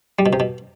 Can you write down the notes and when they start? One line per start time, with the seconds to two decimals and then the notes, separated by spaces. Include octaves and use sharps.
0.19 G3
0.26 B2
0.33 C3
0.40 B2